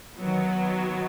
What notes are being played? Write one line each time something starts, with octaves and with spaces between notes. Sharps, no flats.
D#3 F#3 B3